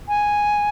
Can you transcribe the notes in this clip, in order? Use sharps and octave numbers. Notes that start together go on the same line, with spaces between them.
G#5